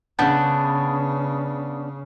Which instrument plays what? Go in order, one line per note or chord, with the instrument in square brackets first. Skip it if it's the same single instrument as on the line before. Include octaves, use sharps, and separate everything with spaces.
[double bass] C#3 [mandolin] B3 D4 G6